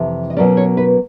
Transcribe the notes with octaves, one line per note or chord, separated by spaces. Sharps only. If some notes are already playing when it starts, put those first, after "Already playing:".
Already playing: F2 C3 E3
D#5
B2 F#3 A#3 C#4 D5
C#5
B4